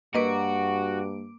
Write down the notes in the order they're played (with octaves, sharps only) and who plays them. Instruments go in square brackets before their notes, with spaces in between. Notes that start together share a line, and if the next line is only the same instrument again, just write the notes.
[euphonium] G2 [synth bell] A#3 D6 D7 [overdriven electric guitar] F#4 [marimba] B4 D#5